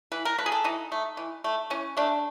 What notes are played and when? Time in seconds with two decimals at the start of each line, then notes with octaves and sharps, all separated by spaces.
0.12 E3 B4
0.25 A#4
0.38 A3 B4
0.46 G#4
0.52 A4
0.64 E3 D#4
0.92 A3
1.17 E3
1.44 A3
1.70 E3 C#4
1.97 A3 D4